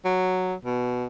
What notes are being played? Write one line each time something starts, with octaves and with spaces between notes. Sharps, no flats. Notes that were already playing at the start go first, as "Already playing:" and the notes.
F#3
B2